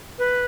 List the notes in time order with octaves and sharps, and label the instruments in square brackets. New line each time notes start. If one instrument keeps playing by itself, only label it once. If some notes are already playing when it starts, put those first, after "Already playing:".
[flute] B4